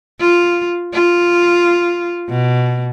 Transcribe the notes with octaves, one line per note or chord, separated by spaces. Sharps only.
F4
F4
B2